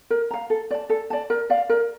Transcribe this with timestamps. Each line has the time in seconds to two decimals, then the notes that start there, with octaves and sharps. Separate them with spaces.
0.10 A#4
0.31 F5 A#5
0.50 A4
0.71 D5 A5
0.90 A4
1.10 D5 A5
1.30 A#4
1.50 D5 F5
1.69 A#4